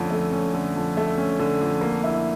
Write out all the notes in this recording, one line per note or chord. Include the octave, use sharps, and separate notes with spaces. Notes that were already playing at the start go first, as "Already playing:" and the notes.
Already playing: F2 D3 A3 C#4
A3
C#4
D3
F2
A3
C#4
D3
F2
A#3
E4